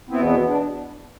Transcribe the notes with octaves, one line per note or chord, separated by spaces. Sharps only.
E2 B2 B3 C4 E4
D4